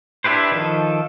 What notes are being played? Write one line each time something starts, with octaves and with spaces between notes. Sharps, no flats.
D4 E4 G4 B4 C5
D#3 F3 A4